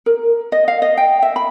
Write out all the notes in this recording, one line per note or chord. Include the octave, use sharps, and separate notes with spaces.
A#4
D#5
F5
D#5
G5
E5
B5